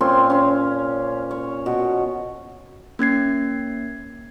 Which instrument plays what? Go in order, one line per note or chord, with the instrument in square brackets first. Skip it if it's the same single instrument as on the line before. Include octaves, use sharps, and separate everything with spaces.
[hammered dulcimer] A#2 C4 C#4 C6
C#4 C5
C#5
B2
[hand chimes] A#3 C#4 G#6 C7